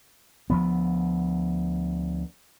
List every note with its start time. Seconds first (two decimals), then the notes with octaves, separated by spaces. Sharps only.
0.50 D2 F3 B3